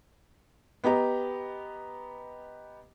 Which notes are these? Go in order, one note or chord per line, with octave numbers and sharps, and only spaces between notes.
B3 G4 D#5 A#5